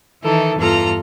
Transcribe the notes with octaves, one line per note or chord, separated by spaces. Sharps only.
D#3 E3 D#4 E4 A4
E2 G2 F4 A4 A#5 F6